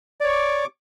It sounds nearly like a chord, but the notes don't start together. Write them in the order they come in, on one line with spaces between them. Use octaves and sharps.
D5 C#5 C#6 D6